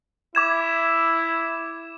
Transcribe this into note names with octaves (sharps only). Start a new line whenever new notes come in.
E4 D6 G#6 E7